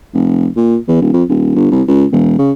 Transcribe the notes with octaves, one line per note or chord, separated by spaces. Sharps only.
F1
A#2
E2
D#1
F2
D#1
G1
C2
C#2
E1
C#3